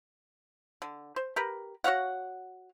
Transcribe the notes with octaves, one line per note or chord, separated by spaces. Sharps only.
D3
C5
G4 A#4 B4
F#4 C#5 F5 F#5